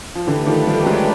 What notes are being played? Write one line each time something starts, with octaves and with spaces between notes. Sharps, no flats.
F3
D3 E3 A3 D4 G4 B4
D#3 F3
F3 G3
F#3 G#3